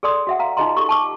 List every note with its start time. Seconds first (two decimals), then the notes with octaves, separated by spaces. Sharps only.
0.03 G#4 A4 D5 C6 D#6
0.27 F#4 E5 F#5
0.39 F5 A#5
0.57 D#4 F4 G#4 D#5 A#5 C6
0.77 G4 A4 C#6
0.89 A5 C#6 D6